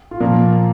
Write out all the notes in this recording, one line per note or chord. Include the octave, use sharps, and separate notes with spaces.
F4
A#2 F3 A#3